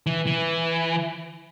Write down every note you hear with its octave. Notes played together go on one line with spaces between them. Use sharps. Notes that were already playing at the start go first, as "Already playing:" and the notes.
E3
E3